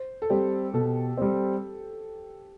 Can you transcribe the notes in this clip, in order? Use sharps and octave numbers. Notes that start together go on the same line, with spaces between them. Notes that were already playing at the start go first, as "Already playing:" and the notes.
Already playing: C5
A4
G3 C4 G4
B2 A4
G3 C4